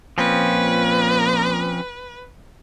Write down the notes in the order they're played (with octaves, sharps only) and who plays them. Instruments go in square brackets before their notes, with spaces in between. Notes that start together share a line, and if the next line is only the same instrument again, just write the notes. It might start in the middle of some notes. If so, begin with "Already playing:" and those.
[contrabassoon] A#2 [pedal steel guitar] F3 C4 C#4 [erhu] B4